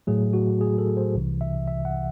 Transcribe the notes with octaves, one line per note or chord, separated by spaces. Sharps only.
A2 F#3 A3 G#4
F#4
G#4
A4
C5
C2 C3 E3
E5
E5
F#5